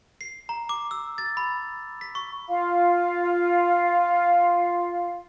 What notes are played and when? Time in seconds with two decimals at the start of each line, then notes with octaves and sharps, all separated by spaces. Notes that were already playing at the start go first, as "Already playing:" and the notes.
0.21 C7
0.49 A#5
0.69 D6
0.91 E6
1.18 A6
1.37 B5
2.01 B6
2.15 C#6
2.47 F4 F5